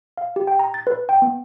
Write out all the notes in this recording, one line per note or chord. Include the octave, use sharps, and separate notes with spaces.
F5
G4
G5
A#5
A6
B4
G5
B3